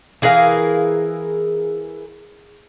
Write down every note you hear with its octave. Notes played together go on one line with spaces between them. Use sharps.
E3 G#4 A#4 F5